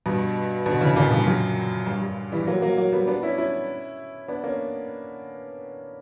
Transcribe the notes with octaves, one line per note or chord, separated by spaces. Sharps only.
G2 B2
B2 D3
C#3 E3
A#2 C#3
G2 B2
F#2 A#2
G2
G2
E3 G3
F#3 A#3
F#3 A#3
F#3 A#3
G3 B3
B3 D4
C#4 E4
C#4 E4
B3 D4
A#3 C#4